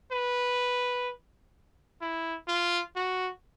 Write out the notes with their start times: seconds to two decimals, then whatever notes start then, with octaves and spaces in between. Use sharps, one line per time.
0.12 B4
2.01 E4
2.48 F4
2.96 F#4